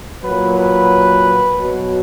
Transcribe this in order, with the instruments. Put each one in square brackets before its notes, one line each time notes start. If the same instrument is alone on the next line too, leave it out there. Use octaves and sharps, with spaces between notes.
[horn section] A#2 F#3 B4
B4
B2 F#3